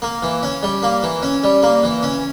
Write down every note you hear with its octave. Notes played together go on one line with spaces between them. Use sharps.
A#3
E3
C#4
G3
A#3
E3
C#4
G3
A#3
E3
C#4